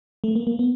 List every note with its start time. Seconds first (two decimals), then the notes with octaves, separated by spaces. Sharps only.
0.24 A3
0.36 A#3
0.47 A#3
0.59 B3